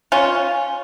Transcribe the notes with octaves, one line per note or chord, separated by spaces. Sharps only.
C#4 F4